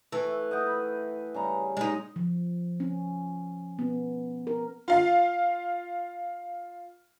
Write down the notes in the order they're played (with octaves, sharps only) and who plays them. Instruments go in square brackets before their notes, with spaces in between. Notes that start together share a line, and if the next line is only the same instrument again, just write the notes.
[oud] E3 [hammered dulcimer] A3
[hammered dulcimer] D#5 F#5 G5
B5
C#3 G3 A#5
[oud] G#3 D#4 [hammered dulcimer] G#4
[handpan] F3
C#4
B3
A#4
[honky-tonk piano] F4 F5